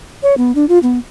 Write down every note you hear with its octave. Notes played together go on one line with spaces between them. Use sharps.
C#5
B3
D4
F4
B3